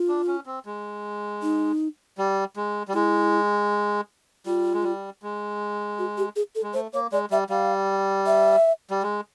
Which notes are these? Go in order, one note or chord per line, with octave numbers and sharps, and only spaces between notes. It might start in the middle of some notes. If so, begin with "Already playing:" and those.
Already playing: F4
D4
C#4
C4
G#3
D#4
G3
G#3
G3
G#3 E4
G3 F4
G#3
G3
G#3
F#4
G4
G#4
A4
G#3
A3 C5
A#3 C#5
G#3 D5
G3 E5
G3 F5
E5
G3
G#3